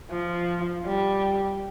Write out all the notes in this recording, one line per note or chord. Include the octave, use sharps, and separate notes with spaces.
F3
G3